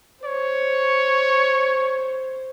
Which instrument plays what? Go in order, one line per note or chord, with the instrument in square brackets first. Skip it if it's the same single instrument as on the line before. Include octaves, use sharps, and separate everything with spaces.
[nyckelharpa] C5 [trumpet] C#5